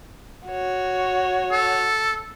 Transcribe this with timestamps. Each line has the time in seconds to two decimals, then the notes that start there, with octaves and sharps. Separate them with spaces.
0.48 F#4 C#5
1.52 A4